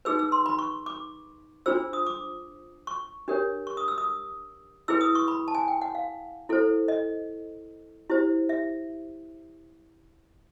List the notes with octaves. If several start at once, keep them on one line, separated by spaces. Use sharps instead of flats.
D#4 G#4 B4 E6
E6
C6
B5
C#6
D6
D4 F4 G#4 C5 E6
D#6
D6
C#6
D4 G4 A#4 C#5
C#6
D#6
E6
D#6
E4 G#4 B4 E6
D#6
C#6
B5
A5
G#5
G5
F#5
F5
E4 A4 C5
D#5
E4 G4 C5
E5